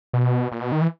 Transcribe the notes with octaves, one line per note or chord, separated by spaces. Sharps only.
B2
A#2
B2
D#3
E3